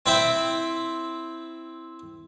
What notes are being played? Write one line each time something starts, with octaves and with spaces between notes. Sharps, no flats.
C4 E4 E5 G5